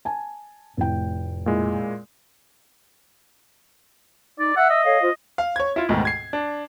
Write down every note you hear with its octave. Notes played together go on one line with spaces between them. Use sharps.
G#5 A5
F1 A2 G5
A#2 G#3 E4
D#4 D5
E5 F#5 E6
D#5
A4 C#5 F5
F4 C5
F5
C#5 G#6
E4 F4
D2 G#2 B2 D#3
G#6 C7
D4